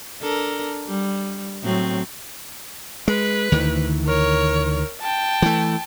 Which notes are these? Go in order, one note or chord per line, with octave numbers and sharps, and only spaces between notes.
D4 A4 A#4
G3
A2 F#3 C4
G#3 B4
D2 D#3 E3
A#4 C#5
G5 A5
E3 A3